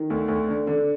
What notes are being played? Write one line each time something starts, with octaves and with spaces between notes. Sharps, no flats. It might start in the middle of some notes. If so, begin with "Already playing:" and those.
Already playing: D#3
D2
D2
D3
D3